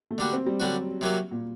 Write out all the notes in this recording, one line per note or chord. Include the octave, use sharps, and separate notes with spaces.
A3
D3 G3 A#3 D4 F#4
C4
G3
D3 F#3 G3 D4 F#4
C3 F#3 A#3 F#4
A#2